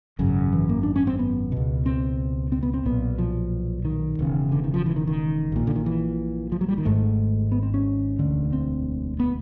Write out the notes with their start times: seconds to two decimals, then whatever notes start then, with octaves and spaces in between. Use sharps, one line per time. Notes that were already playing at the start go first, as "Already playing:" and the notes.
0.19 G#1 F#2 C#3
0.53 E3
0.69 A#3
0.83 D4
0.96 C#4
1.07 C4
1.19 B3
1.52 C#2 B2
1.86 C4
2.52 C4
2.63 B3
2.74 C4
2.86 B1 A#2 B3
3.18 F3
3.85 D#3
4.19 E1 E2 C#3
4.52 D3
4.64 D#3
4.74 F3
4.86 E3
4.96 D#3
5.07 D#3
5.52 A#1 A#2
5.67 D3
5.76 D#3
5.86 E3
6.52 F3
6.61 F#3
6.69 G3
6.78 D#3
6.85 G#1 G#2 A3
7.52 B3
7.63 C4
7.74 C#4
8.19 E1 D2 D3
8.53 C4
9.20 B3